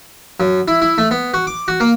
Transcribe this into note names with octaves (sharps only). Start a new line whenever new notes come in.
F#2
E4
E4
A3
B3
F#4
D6
F#4
A#3